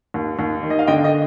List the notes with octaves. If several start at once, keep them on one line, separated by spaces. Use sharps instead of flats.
D#2
D#2
D#3
D#5
F5
D3 D#5 G5
D#5 G5